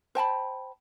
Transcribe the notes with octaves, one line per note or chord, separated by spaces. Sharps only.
C5 G5 A5 B5